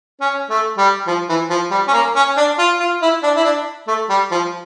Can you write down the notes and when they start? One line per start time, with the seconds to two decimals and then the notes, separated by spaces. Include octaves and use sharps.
0.21 C#4
0.50 A3
0.78 G3
1.07 F3
1.29 E3
1.50 F3
1.71 G3
1.88 C#4
1.93 A#3
2.16 C#4
2.37 D4
2.59 F4
2.80 F4
3.02 E4
3.23 D4
3.36 E4
3.44 D4
3.88 A3
4.10 G3
4.31 F3